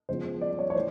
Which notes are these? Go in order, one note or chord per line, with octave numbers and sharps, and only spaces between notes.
C#3 F3 G#3 B3 C5
D5
C#5
C#5
E3 A3 C5